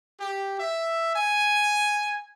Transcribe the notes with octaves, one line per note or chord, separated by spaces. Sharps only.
G4
E5
G#5